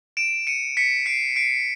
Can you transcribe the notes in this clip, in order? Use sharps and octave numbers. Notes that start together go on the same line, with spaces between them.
D7 E7
C#7 D#7
B6 C#7
C7 D7
C7 D7